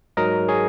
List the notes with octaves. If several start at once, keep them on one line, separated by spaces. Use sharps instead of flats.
G#2 F#3 A#4 D#5
G#4 C#5